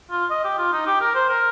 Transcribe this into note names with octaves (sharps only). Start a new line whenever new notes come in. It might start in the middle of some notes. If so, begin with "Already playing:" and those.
F4
D#5
G4
F4
D#4
G4
A#4
C5
A#4